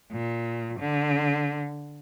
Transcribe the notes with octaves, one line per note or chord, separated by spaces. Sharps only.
A#2
D3